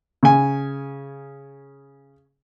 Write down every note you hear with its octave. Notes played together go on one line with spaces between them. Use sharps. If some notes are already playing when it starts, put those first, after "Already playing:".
C#3 G#5